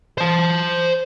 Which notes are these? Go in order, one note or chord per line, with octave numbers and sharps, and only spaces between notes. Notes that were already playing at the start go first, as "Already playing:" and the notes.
C5 A5